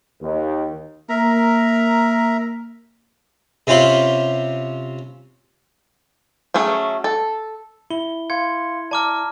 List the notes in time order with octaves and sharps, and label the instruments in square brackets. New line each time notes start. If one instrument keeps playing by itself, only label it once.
[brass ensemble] D#2
[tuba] A#3 [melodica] A#4 E5 A#5
[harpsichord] C3 C4 C#4 F4 B5 C6
[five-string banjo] F#3 A3 C#4 G#4
A4
[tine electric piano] E4 [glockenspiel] G7
[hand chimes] F5 C6 C#7 [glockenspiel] G#6
[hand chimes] D5 A#5 [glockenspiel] A5 D6 F6